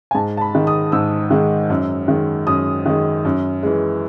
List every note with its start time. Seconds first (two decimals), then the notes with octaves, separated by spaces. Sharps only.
0.11 G#5
0.15 G#2 A5
0.37 A5
0.41 B5
0.54 D#3 G#3
0.67 D#6
0.92 G#2 E6
1.31 D#3 G#3
1.70 F#2
2.08 D#3 G#3
2.47 F#2 D#6
2.86 D#3 G#3
3.25 F#2
3.63 E3 G#3